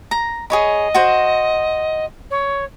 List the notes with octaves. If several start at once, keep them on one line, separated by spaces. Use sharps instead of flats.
A#5
G#4 C#5 D#5 B5
F#4 C5
C#5